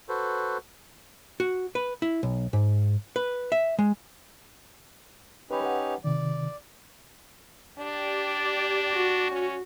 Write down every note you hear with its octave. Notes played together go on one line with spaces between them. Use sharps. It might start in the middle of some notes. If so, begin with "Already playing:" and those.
F#4 A4 B4 C5
F#4
B4
E4
B1
G#2
B4
E5
G#3
C#4 D#4 G4 B4 B5
B4 F#5
C3 D#3 D5
D4 G4 D5
F#4
C#4